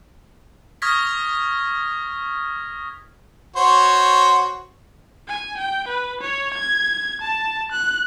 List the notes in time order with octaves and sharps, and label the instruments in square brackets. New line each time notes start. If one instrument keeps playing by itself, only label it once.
[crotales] C#6 D#6 F6 G#6 A#6 B6
[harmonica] F#4 C5 C#5
[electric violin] G#5
G5
B4
C#5
G#6
A5
F#6